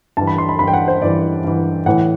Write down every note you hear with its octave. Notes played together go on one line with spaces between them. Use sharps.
G2 E3 A5
B5
C6
B5
G2 E3 B5
G5
F#5
C5
G2 E3 D5
G2 E3
A2 E3 F#5